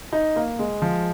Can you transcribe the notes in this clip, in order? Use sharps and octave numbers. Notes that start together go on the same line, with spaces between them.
D#4
A#3
G#3
F3